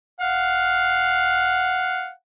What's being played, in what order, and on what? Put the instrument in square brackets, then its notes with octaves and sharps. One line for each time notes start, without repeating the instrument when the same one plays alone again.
[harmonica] F5 F#5